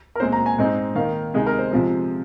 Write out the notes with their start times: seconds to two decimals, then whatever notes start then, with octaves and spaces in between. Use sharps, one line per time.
0.16 A#4
0.20 A#2 G#3 C4 C5
0.32 A#5
0.46 G#5
0.58 G#2 G#3 C4 D#4
0.95 D#3 A#3 D#4 F5
1.34 C3 G#3 D#4 G#4
1.46 A#4
1.59 C5
1.71 C3 F3 G#3